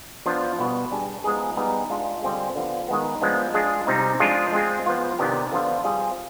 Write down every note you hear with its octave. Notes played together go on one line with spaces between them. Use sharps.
F3 B3 D4 F4
B2 G3 B3
G3 D4 G#4
F3 G#3 B3 D#4 G#4
G3 B3 D#4 G#4
G#3 D4 F4
D3 G3 C4 F4 G#4
D3 F3 B3
D#3 G#3 B3
F3 G#3 B3 D4
G#3 D4 F4 G#4
C3 G3 C4 D#4
F3 G#3 D4 F4 G#4
G#3 C4 F4 G#4
F3 B3 F4
C3 D#3 B3 D4 G4
D3 F3 B3 D4 F4
G3 C4 F4 G#4